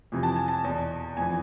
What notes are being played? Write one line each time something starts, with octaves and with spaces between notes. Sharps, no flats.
F2 C3 E3
A5
G#5
A5
E2 B2
F2 E3 G#5